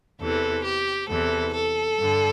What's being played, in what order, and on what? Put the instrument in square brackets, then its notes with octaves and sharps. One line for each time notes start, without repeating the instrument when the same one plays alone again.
[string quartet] E2 C3 E3 A4
G4
E2 C3 E3 A4
A4
G2 D3